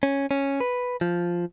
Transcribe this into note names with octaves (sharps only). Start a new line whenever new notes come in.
C#4
C#4
B4
F3